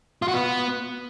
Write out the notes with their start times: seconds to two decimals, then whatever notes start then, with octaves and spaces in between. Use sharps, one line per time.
0.22 F4
0.28 F#4
0.34 B3